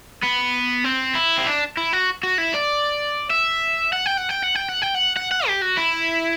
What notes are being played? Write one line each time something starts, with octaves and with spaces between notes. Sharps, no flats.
B3
C4
E4
C4
D4
E4
F#4
F#4
E4
D5
E5
F#5
G5
F#5
G5
F#5
G5
F#5
G5
F#5
F#5
F#5
G4
F#4
E4